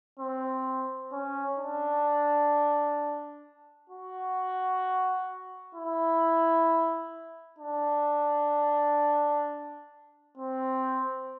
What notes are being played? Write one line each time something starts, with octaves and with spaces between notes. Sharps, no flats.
C4
C#4
D4
F#4
E4
D4
C4